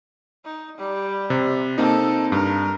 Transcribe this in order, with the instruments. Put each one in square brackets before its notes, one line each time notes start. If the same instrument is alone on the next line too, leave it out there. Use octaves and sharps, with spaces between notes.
[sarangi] D#4
G3
[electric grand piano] C3
[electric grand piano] A#3 C4 D#4 [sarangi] A4
[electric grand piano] G2 [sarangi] A#4